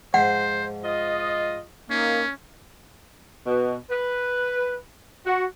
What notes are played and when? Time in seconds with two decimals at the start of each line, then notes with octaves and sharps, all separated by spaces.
0.14 G#2 F3 C5 F#5
0.84 F4 D#5
1.90 A#3 C#4 D#4
3.47 B2
3.90 B4
5.26 F#4